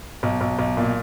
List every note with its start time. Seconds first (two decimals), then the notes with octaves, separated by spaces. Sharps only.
0.23 B1
0.41 B1
0.59 B1
0.77 A#2